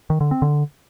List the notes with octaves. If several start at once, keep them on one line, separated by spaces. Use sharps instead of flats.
D#3
D3
C4
D3